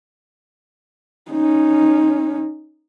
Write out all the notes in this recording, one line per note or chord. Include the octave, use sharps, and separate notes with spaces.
C#4 D#4